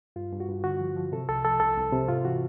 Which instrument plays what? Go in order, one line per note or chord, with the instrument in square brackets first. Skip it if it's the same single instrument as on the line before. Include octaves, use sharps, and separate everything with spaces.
[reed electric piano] G2 F4
G2
F#4
G2
D3 F#4
F3
F3
C3 A4
C2 A4
F3 A4
C2 A4
C2
C3
G#2 F4
E3 F#4